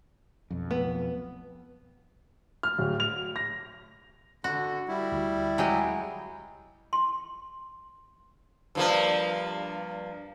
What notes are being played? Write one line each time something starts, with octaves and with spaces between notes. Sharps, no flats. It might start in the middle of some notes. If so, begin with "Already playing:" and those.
B1 F2
B3
F6
D1
F7
A#6
D3 F#4
G3 E4
D2
F#3 G#3 G4
C6
G2 F3 A#3